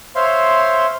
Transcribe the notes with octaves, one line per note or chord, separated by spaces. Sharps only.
C5 C#5 E5 F5 C6